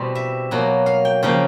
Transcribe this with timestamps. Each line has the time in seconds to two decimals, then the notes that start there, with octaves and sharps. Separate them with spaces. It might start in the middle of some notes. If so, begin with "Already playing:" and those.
Already playing: B2 E3 G3 C4 D5
0.15 E5
0.51 B2 F#3 A#3
0.86 F5
1.05 G5
1.23 C#3 F3 A#3 G5